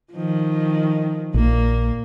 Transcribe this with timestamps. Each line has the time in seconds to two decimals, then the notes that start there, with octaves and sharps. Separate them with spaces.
0.13 D#3 F3
1.34 A#1 A#2 A#3